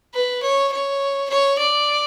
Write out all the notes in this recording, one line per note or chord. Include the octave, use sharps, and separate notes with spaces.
B4
C#5
C#5
C#5
D5